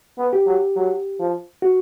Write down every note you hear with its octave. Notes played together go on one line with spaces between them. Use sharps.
B3
G4
F#3
F#3
F3
F#4